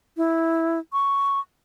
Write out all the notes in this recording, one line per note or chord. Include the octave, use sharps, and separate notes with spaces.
E4
C#6